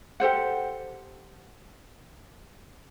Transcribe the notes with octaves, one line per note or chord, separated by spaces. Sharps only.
G4 A4 C5 F#5